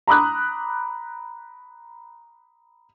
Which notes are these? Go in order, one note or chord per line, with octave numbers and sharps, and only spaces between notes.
A#5 B5 D6 D#6 F#6